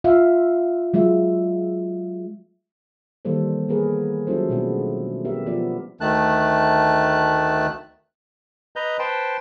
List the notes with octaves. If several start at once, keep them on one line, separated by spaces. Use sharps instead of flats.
F4 E5 F5
F#3 G#3 F4 E5
D#3 E3 G3 A#3 A4 C5
A#3 B3 G#4 A#4 B4
F#3 C#4 E4 F4 A4 C5
B2 G#3 A3 B3 D4 E4
B3 G4 A#4 E5
F3 B3 F4 D5
D2 D#3 A3 A5 F#6
B4 D#5 A#5 G6
B4 C5 G5 A5 C6